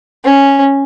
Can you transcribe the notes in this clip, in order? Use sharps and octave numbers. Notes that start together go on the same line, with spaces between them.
C#4